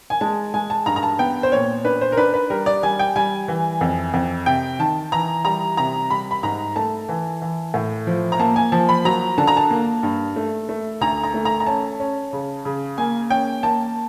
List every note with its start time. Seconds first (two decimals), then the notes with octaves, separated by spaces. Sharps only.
0.10 G#5
0.21 G#3 A5
0.54 G#3 G#5
0.70 A5
0.86 G2 A#5
0.96 A#5
1.03 A5
1.19 B3 G5
1.43 C5
1.52 A#2 C#5
1.85 D4 B4
2.01 C5
2.12 A#4
2.17 D4 B4
2.34 B4
2.50 G3 A#4
2.66 D5
2.83 G3 G#5
2.99 G5
3.16 G3 G#5
3.48 E3
3.81 F2
4.14 F2
4.46 C3 G5
4.79 D#3 A5
5.12 E3 A#5
5.45 G3 A#5
5.77 C3 A#5
6.10 G3 B5
6.31 B5
6.43 G#2 A#5
6.76 A3 A5
7.09 E3
7.42 E3
7.74 A2
8.07 F3
8.32 A#5
8.39 A#3 A5
8.56 G#5
8.72 F3 A5
8.89 B5
9.05 F#3 A#5
9.38 D3 A5
9.47 A#5
9.57 A5
9.71 A#3
10.03 G2
10.36 A3
10.69 A3
11.01 D2 A#5
11.23 A#5
11.34 A3
11.45 A#5
11.60 A#5
11.67 C#4 A5
12.00 C#4
12.33 C#3
12.65 C#3
12.98 A#3 G#5
13.30 C#4 G5
13.63 A#3 A5